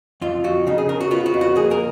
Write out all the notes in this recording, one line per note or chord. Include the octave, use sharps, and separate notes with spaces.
F2 F4
F2 F#4
C#3 D#4
G#4
C#3 A#4
F#4
B3 F4
F#4
F2
F#4
A#3 G#4
A#4